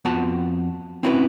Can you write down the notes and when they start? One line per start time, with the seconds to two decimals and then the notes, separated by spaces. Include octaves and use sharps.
0.05 F2 B3 F4 F#4 F#5 A5
1.03 C4 C#4 E4 F#4 A#4 B4